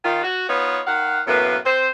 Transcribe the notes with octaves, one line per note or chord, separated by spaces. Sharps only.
D#3 F4
F#4
B3 D#4 F4 B4 C#5
D#3 F5 F#5
F#2 A2 A#3 B3 B4
C4 C5